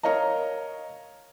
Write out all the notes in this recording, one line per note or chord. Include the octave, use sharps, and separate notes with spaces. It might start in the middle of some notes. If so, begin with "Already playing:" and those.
A#4 C#5 D#5 F5 A#5